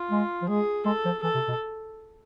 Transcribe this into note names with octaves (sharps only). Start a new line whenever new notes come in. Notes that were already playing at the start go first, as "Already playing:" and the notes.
Already playing: F4
G#3
F3
G#3 G#4
G#3 A4
F3
E3 A4
C3
B2